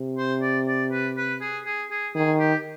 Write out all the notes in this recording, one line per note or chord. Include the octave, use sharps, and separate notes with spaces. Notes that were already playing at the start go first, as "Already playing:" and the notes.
Already playing: C3
C5
D5
D5
B4
B4
G#4
G#4
G#4
D#3 G#4
G4